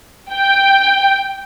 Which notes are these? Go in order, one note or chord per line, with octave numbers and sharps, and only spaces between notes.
G5